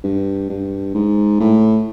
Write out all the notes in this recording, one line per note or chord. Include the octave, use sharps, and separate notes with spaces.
G2
G2
G#2
A2